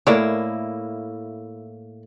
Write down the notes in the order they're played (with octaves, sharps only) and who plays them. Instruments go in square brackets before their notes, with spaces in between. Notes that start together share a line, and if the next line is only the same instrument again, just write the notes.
[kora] A2 A#3 E4 [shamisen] C#5 D5